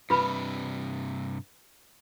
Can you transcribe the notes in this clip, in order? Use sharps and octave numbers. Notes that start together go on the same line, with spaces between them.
G2 C3 F4 B4 B5